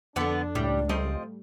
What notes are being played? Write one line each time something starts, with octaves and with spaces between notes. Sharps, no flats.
F2 D3 B3 D4 A4
C#2 A2 G3
F3 G3 A3 C4 D#5